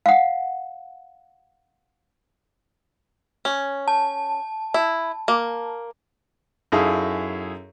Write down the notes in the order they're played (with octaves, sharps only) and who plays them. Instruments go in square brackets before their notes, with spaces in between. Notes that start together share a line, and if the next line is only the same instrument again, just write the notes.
[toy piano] F5 F#5
[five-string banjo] C#4
[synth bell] A5
[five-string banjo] E4
A#3
[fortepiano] F#2 D#4 E4 G#4 A4 F5